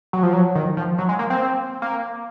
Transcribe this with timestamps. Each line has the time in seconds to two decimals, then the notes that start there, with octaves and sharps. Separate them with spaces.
0.13 F#3
0.23 F3
0.34 F#3
0.55 D#3
0.77 F3
0.98 F#3
1.09 G#3
1.19 A#3
1.30 C4
1.82 A#3